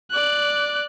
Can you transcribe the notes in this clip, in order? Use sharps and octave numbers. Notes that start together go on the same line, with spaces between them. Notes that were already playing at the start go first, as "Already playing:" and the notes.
D5 F#6